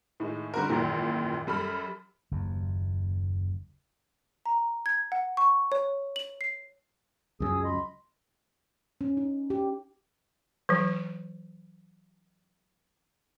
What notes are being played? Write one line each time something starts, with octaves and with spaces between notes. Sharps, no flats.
A2 D#3 G#3
D3 G3 C4 F#4 A#4
G#1 C#2 F#2 A#2 E3
F#2 G3 A4 B5 F6
F#1 D#2
A#5
G#6
F#5
C#6
C#5
F#7
C7
C#2 F#2 G#4 D#6 E6
D#5 B5 C6
C#4
D#4
G4
E3 F#3